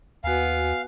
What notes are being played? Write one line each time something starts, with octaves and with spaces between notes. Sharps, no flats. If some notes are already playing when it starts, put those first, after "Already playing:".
D#2 B3 F#4 F5 G#5